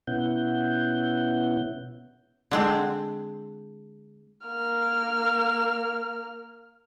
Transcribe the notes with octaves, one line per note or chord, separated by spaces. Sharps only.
B2 B3 C#4 E4 F#5 G6
D3 G#3 C4
A#3 F6